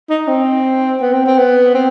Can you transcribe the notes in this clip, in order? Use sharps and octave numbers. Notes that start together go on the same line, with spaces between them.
D#4
C4
B3
C4
C4
B3
C4